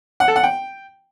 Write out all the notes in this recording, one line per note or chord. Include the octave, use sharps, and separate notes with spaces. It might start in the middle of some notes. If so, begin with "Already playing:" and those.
F#5
A4
F#5
G5